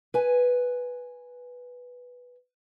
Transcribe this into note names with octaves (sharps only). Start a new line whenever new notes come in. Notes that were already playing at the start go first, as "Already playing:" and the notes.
B4 G#5